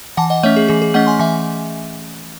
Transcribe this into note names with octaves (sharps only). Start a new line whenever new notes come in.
E3 F#5 A5
D#5 F#5
A3 C#4 C#5 E5
G#4
E3 G#4
G#4
A3 C#4 D#5 F#5
G#5 C6
E3 E5 G#5